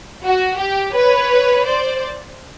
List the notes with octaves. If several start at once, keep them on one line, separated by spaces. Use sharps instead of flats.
F#4
G4
B4 C#5
C5 D5